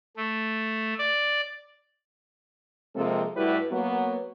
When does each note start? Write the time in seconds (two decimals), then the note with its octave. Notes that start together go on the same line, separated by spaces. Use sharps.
0.17 A3
0.99 D5
2.96 C3 F3 G#3 A#3 C4 A4
3.36 A2 G3 E4 F#4 B4
3.72 F#3 A#3 B3